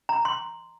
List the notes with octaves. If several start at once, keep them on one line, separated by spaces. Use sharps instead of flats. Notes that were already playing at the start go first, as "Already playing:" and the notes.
A#5
C6